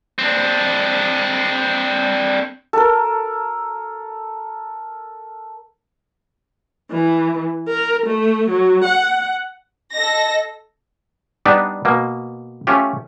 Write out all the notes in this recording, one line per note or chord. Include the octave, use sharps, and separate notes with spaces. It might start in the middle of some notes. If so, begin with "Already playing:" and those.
C4 D4
A4 A#4
E3
A#4
A3
F#3
F#5
A4 D#5 A#6
G3 B3 D4 D#4 B4
B2 A#3
A3 C#4 F4 G4